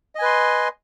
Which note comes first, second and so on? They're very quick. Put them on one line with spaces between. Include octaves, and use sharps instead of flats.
D#5 G#5 B4 C6